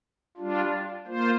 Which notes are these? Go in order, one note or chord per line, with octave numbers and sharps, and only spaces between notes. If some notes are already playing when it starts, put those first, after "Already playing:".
G3 D4 F4
A#3 F4 C5